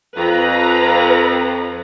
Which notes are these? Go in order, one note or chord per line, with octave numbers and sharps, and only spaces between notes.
F2 B4 A#5